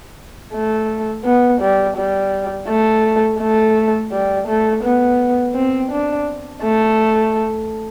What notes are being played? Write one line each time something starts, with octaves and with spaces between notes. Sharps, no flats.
A3
B3
G3
G3
A3
A3
G3
A3
B3
C4
D4
A3